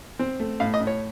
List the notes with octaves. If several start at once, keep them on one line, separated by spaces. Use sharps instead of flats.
C4
A3
A2 F5
D#5
A2
C#5